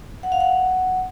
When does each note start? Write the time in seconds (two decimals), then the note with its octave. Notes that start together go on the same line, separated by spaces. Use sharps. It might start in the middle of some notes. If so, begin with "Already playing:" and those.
0.23 F#5
0.32 F5
0.40 F#5